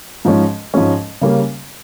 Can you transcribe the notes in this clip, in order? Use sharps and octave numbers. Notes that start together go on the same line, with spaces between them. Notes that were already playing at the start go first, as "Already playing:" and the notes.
G#2 F3 G#3 C#4
G#2 F3 G#3 C#4
C#3 G3 A#3 C#4